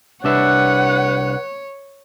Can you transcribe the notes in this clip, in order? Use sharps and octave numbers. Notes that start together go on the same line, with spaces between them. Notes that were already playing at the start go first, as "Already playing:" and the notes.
C2 D4 B4 C#5 E5 F#5